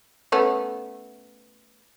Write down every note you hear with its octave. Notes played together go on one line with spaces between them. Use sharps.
A3 B3 C#4